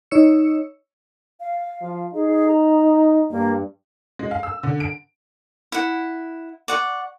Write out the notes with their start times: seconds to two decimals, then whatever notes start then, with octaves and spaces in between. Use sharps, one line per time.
0.11 D#4 C#5 E6 C#7
1.40 F5
1.81 F3
2.14 D#4 G#4
2.48 A#5
3.30 G2 A#3
4.19 G#3
4.31 F5
4.43 E6
4.63 D3
4.80 D7
5.72 E4 F#5
6.68 D5 F#5 C#6